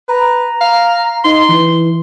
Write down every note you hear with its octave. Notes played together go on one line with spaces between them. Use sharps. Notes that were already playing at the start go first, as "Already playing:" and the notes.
B4 A#5
F5
D#4 C6
E3